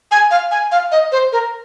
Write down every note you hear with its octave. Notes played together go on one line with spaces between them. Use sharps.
G#5
F5
G#5
F5
D#5
C5
A#4